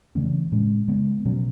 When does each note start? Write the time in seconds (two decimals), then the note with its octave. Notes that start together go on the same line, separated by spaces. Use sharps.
0.15 C#3 E3 A3 C#4
0.52 A2 G#3 C#4
0.88 C#3 G#3 B3
1.25 B2 F#3 C#4